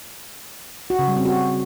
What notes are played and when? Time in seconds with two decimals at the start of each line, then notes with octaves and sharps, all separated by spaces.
0.90 F#4
0.99 C#3
1.08 G3
1.17 C4
1.25 F#4